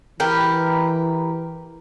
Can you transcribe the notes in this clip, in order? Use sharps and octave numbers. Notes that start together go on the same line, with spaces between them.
E3 G4 A#4 B4